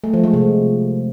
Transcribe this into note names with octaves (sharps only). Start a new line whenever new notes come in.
A3
F3
G#3
C3